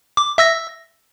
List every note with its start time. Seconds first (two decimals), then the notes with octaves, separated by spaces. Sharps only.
0.17 D6
0.38 E5 E6 A#6